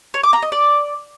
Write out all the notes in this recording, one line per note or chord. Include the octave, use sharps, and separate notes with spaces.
C#5
D6
A#5
D#5
D5